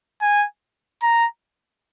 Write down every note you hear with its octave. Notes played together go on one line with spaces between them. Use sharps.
G#5
A#5